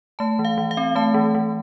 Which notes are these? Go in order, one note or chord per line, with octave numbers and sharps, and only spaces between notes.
A3 A5
E3
F5
E3
F5
C4
A3 A5
E3
E3